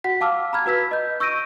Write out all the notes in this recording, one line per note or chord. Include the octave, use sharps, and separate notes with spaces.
F#4 F#5 B6
F5 A5 D6 E6 F6
A#5 B5 F6 G#6
F#4 B4 E6 B6
D#5 G6
C#6 E6 G6 A#6 D7 D#7